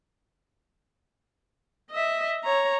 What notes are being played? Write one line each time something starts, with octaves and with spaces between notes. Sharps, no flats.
D#5 E5
C#5 A#5